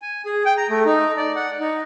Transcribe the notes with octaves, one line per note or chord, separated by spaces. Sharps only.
G#5
G#4
G5
A#5
A3
D#4
D5
F#5
D#4